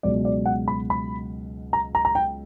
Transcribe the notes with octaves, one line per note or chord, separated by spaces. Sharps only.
C#2 B2 F#3 D5
D5
F#5
B5
B5
A#5
A#5
A#5
G5